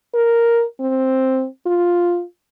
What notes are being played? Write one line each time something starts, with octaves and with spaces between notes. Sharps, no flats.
A#4
C4
F4